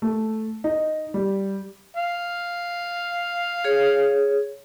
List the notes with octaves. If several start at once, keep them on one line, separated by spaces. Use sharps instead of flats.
A3
D#4
G3
F5
G#4 C#5